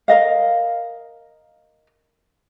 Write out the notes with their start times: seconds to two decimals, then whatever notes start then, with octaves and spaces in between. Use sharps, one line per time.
0.08 A#4 D#5 F5